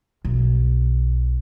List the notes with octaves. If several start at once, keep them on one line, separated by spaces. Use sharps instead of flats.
B1